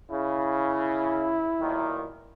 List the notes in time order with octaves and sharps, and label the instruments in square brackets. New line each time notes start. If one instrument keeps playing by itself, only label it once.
[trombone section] C#3 [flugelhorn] E4
[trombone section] B1 A#2 D#3